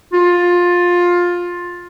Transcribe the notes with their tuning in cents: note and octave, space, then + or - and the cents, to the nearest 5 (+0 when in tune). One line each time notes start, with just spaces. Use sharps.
F4 +15